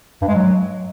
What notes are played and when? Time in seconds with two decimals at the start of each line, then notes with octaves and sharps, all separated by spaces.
0.22 G2
0.28 G#3
0.35 F#3